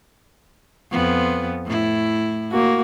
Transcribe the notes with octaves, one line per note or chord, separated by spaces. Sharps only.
F2 B3
A2 E4
A#3 F#4